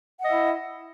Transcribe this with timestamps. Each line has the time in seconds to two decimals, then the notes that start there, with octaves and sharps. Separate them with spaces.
0.20 F#5
0.23 D#5
0.26 E5
0.29 E4